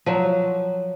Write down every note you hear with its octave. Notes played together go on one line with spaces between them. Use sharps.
F3 F#3